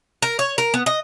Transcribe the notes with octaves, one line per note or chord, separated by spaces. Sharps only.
A#4
C#5
A#4
B3
D#5